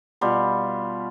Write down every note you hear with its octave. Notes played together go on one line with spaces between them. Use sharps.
B2 G3 F4